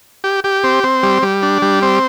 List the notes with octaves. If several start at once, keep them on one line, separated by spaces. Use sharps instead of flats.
G4
G4
C4
C4
G3
G3
D4
G3
C4